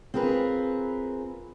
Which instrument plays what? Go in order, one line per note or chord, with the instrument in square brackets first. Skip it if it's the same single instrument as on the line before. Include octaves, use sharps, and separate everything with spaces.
[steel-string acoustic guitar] C4 F4 G#4 A#4 B4